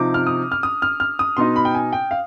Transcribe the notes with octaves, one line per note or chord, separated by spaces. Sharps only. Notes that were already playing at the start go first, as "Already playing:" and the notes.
Already playing: C3 F3 C4 D#4 D6
F6
D#6
F6
D#6
F6
F6
D#6
B2 B3 D#4 C6
B5
G5
G#5
G5
F5